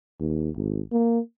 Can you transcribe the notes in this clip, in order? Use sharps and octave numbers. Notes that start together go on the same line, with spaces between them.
D#2
G#1
A#3